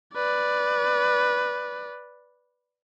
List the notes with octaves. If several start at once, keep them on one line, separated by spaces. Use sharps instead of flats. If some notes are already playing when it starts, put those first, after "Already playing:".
B4 D5